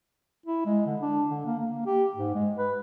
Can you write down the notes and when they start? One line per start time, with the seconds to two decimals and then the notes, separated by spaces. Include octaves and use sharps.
0.46 E4
0.66 G#3
0.86 D3
1.02 D4
1.29 D3
1.46 A#3
1.60 A#3
1.86 G4
2.16 G#2
2.35 G#3
2.57 B4